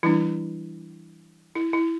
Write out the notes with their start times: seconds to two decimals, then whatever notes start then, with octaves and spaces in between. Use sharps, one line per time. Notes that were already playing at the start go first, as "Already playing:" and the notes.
0.03 E3 G3 D4 E4
1.55 E4
1.73 E4